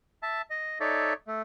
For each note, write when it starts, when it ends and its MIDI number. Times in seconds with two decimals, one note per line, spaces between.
0.23 0.42 76
0.23 0.42 81
0.50 0.78 75
0.80 1.13 63
0.80 1.13 69
0.80 1.13 73
0.80 1.13 74
0.80 1.13 76
1.27 1.42 57